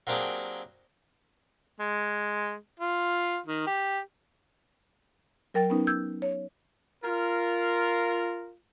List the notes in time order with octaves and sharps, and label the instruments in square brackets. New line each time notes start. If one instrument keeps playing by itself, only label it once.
[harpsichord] F#3 A#3 C4 D4 G4 G#4
[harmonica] G#3
F4
D#3
G4
[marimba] F#3 A#4 G5 A6
B3 C#4 D#4 B4
E6 G6 G#6
C#5
[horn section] F4 A#4